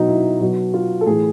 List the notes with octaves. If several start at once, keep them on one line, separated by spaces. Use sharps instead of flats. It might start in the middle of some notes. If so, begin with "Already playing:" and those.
Already playing: B2 F#3 D#4
E4
B2 F#3
F4
A4
A2 E3 G#4